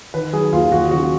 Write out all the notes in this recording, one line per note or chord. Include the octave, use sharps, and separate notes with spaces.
D#3 B4
F#3 G#4
D#2 F4
D#2 F#4
C#3 F#4